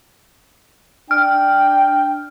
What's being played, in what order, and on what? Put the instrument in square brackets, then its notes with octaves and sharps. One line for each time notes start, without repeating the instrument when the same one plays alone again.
[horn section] D4 G5 [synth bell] F6